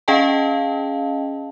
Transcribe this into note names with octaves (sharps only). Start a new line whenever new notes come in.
C#4 G#4 D#5 F5 G5 A5